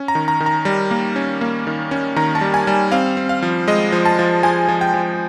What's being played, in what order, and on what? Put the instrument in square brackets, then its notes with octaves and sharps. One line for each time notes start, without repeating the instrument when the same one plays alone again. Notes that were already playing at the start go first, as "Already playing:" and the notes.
Already playing: [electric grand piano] C#4
A#5
D#3
A#5
D#3
A#5
G3
A#3
C#4
A#3
D#3
C#4
D#3 A#5
A5
G3
G#5
G3
C4 F5
C4
F5
F3
G#3 D#5
F3
A5
F3
F3 G#5
F3
G5
F3